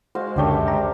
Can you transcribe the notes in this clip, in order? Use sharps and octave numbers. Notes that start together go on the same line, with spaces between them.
G#3 F#4 C5 F5
C#2 F#2 D3 D4 G4 A4 C#5
A#5